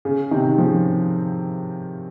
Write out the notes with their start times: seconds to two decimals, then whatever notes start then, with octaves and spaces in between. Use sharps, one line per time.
0.05 C#3
0.31 C3 D#3
0.58 C#3 F3